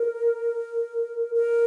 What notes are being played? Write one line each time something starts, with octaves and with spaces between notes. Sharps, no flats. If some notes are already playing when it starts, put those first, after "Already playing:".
Already playing: A#4
A#4